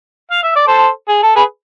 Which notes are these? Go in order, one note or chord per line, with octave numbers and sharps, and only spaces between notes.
F5
E5
D5
A4 C5
G#4
A4
G#4 B4